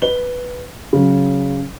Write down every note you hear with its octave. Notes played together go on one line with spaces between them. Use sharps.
B4 G7
C#3 F#3